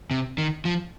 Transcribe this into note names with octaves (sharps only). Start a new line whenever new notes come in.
C3
D#3
F3